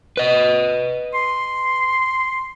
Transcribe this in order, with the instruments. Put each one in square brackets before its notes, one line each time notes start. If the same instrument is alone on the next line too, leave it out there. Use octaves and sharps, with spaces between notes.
[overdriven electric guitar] B4 D#5
[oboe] C6